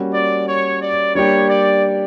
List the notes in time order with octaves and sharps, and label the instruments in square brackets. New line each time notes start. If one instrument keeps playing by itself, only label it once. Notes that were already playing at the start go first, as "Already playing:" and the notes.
Already playing: [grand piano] G3 A#3 C#4 F#4
[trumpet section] D5
C#5
D5
[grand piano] G3 A#3 D4 G4 [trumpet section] C#5
[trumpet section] D5